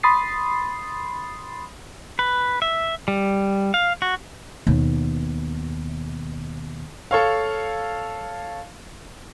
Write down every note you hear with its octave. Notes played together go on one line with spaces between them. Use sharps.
B5 C6 D#6 A6 C7
B4
E5
G3
F5
F#4
D#2 B2
A4 C#5 F5